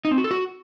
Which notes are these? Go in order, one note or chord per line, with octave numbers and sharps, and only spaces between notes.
D#4
C4
F#4
A4
F#4